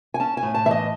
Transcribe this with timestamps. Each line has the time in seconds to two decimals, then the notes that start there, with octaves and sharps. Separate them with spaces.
0.14 G#5
0.20 C#4 A5
0.37 G#5
0.43 A2
0.54 A5
0.65 E3 E5
0.71 D#5